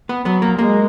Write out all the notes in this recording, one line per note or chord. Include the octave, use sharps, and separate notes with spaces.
B3 B4
F#3 B3 B4
A#3 A#4
G#3 A#3 A#4